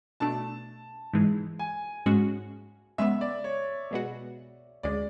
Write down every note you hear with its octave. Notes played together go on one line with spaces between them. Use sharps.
B2 A3 D4 A5
G#2 E3 G#3
G#5
G#2 G#3 C#4 F#4
C#3 G#3 B3 E5
D5
C#5
B2 G#3 B3 F#4
D2 C#3 G#3 D5